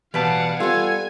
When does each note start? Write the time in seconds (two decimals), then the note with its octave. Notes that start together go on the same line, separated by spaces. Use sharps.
0.14 B2 E3 G3 B4 F5 F#5 A5
0.60 G3 B3 F4 A4 G#5